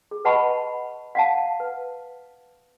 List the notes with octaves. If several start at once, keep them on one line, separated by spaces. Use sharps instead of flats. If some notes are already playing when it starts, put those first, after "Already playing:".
G#4
B4 D#5 F#5 A5 B5 C#6
F5 F#5 A5
B4